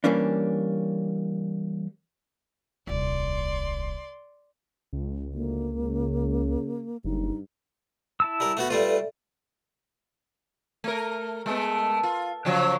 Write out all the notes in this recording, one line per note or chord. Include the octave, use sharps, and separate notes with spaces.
E3 G3 A#3 C#4 D4
D#1 C2 D5 C6
C#2
D2 A#3
C#3
F#1 G2 D#4
E4 A5 E6
G3 A#4
A3 B3 F#4
G3 A3 F4 A4 B4 D5 E5
A3 A#4
G#3 A3 B3
F4
C#3 F3 F#3